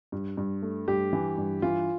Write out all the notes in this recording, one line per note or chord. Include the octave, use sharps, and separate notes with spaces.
G2
G2
A3
G2 G4
E3
G2
E3 F4